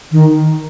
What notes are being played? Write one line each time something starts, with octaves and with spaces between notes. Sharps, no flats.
D#3